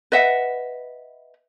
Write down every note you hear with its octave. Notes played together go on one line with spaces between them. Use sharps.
B4 D#5 E5 F#5